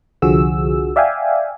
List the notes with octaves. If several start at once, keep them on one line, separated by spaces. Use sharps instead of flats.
C2 D3 F3 F#4 G#4 E6
D5 E5 F5 G5 G#5